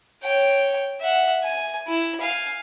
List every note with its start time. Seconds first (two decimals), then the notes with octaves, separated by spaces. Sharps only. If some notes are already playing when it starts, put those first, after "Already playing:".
0.23 C#5 G5
1.00 E5 F#5
1.43 G#5
1.87 E4
2.21 F5 G#5